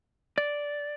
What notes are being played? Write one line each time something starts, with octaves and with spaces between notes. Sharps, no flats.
D5